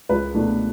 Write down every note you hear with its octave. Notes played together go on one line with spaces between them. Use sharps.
C#2 B4
B2 A3 D4